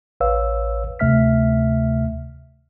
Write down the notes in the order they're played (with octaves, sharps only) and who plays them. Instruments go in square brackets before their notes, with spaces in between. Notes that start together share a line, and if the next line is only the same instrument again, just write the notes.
[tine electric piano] A1 B4 C#5 F5 E6
D2 C3 A3 E5 F6 B6